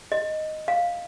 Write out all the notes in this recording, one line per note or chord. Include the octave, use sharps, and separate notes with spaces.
D#5
F5